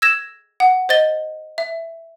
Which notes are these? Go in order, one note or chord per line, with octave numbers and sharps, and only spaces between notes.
E6 G#6 A#6 E7
F#5
C5 D#5 A6 G7
E5